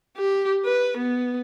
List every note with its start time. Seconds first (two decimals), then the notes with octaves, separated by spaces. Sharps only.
0.17 G4
0.65 B4
0.97 B3